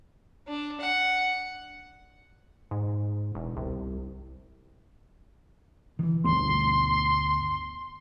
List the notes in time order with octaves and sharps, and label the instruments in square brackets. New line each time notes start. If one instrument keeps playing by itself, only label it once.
[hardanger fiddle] D4
F#5
[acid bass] G#2
E1
C2
[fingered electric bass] D#3 E3
[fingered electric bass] G1 D2 B3 [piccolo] C6